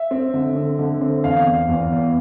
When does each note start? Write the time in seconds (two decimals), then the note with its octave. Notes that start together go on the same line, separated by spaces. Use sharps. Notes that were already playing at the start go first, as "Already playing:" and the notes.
Already playing: E5
0.11 C4
0.34 D3
0.56 C4
0.79 D3
1.01 C4
1.24 E2 F5
1.46 E2
1.69 E2
1.92 E2